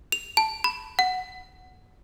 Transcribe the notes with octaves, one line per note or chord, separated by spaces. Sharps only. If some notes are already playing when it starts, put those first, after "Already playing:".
F7
A5
B5
F#5